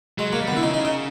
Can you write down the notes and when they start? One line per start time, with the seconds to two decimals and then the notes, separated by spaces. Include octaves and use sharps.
0.18 F#3 G#3
0.30 F#3 A#3
0.41 G3
0.47 D3 B3
0.57 E4
0.63 C#3 D#4
0.74 D#4
0.85 D#4